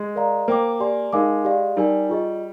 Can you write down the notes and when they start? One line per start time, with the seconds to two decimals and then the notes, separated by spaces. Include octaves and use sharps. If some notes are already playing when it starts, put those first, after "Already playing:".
Already playing: G#3
0.15 A#4 D5 F5 A#5
0.48 A#3 C5 G5 D6
0.80 G4 D5 G#5 C6
1.13 G#3 D#4 A#4 F5 G#5 D6
1.45 G4 D5 F5
1.77 G3 D#4 A#4 D5 G#5
2.09 F4 G#4 D#5